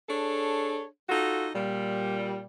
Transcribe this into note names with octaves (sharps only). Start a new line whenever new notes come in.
D4 G#4 A4 C#5
D#4 F4 F#4 A4
A#2 G3